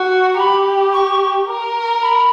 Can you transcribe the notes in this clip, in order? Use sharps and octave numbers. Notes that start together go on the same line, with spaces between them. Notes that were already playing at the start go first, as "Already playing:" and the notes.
Already playing: F#4
A#5
G4 B5
C#6
A#4
B5